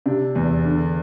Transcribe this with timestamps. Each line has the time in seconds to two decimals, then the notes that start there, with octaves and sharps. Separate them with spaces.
0.06 C3 D4
0.35 E2
0.66 D3